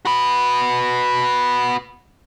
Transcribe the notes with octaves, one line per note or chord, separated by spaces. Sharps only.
F#4 B4